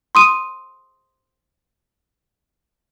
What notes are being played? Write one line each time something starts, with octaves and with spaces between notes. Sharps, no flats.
C6 D#6 D#7